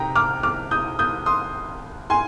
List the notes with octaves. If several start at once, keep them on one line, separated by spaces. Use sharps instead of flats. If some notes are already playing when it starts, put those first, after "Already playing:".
Already playing: C3 D#4 G5 A#5
D6 F6
D6 F6
D#6 G6
D#6 G6
C6 D#6
G#5 C6